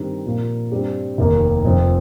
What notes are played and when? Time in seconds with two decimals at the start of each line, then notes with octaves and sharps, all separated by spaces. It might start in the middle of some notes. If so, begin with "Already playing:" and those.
Already playing: G2 D#3 C4 D#4 G4
0.25 A#2 F3 A#3 F4
0.72 G2 G3 C4 G4
1.18 F1 D#2 D#3 A#3
1.65 F1 F2 F3 C4